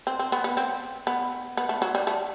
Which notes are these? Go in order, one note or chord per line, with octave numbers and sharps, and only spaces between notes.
C4
C4
B3
B3
C4
B3
B3
A3
F#3
G3
A3